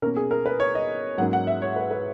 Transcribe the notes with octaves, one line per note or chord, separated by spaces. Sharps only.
B2 A#3 C#4 A#4
G#4
A#4
B4
C#5
D#5
G#2 F#3 A#3 C#4 F#5
F#5
E5
C#5
B4
B4